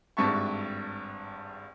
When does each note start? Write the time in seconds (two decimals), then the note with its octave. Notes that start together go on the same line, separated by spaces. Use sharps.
0.17 G#1 G2 E5 A5 C#6